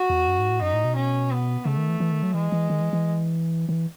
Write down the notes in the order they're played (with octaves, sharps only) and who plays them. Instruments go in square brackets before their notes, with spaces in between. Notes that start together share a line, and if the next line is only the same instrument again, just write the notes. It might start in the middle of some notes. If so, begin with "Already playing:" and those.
Already playing: [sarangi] F#4
[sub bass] E2
F#2
G#2
A2
[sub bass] F#2 [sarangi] D#4
[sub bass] A2
B2
[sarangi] C#4
B3
[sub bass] C#3 [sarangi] A3
[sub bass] D#3
E3
E3
D#3
F#3
[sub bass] E3 [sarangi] G#3
[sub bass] E3
D#3
E3
E3
D#3
E3